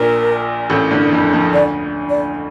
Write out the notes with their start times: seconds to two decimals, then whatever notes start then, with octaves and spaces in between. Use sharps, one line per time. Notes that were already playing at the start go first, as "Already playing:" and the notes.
Already playing: A#1 A#2 A#4
0.70 A1 A2
0.91 G1 G2
1.12 F2
1.33 F2
1.53 D2 D3 D5
2.10 D5